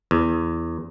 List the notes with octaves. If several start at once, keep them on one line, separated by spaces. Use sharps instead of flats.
E2